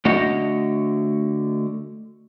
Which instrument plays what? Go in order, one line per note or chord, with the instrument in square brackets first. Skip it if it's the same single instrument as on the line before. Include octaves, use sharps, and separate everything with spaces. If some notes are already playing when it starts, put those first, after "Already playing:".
[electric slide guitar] D3 A3 F#4 C#5 D#5 F#5